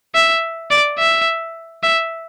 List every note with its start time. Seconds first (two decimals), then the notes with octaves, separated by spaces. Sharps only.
0.15 E5
0.71 D5
0.99 E5
1.83 E5